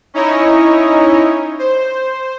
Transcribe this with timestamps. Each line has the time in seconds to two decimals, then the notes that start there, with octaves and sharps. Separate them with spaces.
0.14 C#4 D#4 E4 C#5 D#5
1.59 C5